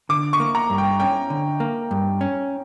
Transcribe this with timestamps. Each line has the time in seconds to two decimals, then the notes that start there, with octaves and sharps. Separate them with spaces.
0.09 D3 D6
0.33 C#6
0.40 A#3
0.55 A#5
0.70 G2
0.78 G5
1.00 C#4 G5
1.30 D3
1.60 A#3
1.91 G2
2.21 C#4